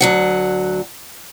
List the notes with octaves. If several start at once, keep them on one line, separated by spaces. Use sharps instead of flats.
D2 F#3 F#5